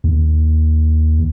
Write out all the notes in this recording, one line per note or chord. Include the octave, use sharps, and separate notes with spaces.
D#2